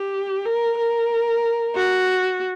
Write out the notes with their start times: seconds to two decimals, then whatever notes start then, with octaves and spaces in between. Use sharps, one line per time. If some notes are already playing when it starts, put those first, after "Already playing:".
Already playing: G4
0.45 A#4
0.78 A#4
1.75 F#4